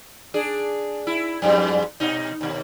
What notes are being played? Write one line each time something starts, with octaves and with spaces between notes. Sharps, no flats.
D4 G#4
E4
F2 G#2 G3
B2 D#4
D#2 B2